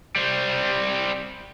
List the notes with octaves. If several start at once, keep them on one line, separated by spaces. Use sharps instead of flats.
G3 C4